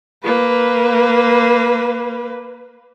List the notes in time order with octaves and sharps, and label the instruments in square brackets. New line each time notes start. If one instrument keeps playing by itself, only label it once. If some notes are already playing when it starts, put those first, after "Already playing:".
[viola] A#3 B4